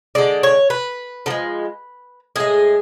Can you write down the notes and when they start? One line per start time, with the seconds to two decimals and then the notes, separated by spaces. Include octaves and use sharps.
0.15 D3 G#3 D5
0.43 C#5
0.70 B4
1.26 D3 F3 G#3
2.36 A2 G#3 G#4